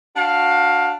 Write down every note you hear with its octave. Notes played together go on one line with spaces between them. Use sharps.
D4 F#4 F5